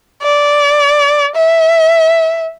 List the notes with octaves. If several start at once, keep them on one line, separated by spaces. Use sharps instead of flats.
D5
E5